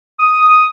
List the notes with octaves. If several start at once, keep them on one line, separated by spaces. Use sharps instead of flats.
D#6